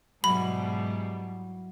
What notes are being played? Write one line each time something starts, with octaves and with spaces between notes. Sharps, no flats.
G#2 B2 F#3 G3 E4 B5